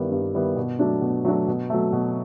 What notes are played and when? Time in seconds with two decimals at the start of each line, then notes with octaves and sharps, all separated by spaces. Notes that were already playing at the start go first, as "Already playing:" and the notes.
Already playing: G2 D#3 G3 B3 E4
0.11 G2
0.34 D#3 G3 B3 E4
0.56 B2
0.79 F#3 A3 D4 F#4
1.01 B2
1.25 F#3 A3 D4 F#4
1.48 B2
1.70 F#3 A3
1.93 B2